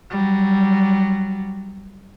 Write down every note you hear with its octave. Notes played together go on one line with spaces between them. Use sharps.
F#3 G3